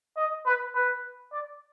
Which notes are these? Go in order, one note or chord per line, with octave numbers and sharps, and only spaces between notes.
D#5
B4
B4
D5